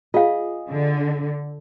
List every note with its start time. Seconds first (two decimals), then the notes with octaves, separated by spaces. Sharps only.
0.14 F4 G#4 D#5 F5
0.69 D3